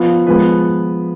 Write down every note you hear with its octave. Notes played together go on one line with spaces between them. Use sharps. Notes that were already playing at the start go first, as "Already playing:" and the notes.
Already playing: F3 B3 F4
F3 G#3 B3 B4